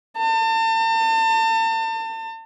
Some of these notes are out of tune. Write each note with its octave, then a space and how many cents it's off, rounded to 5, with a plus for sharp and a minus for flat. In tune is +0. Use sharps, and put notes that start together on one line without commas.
A5 +35